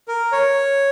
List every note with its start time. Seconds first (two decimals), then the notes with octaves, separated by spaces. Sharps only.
0.08 A#4
0.32 C#5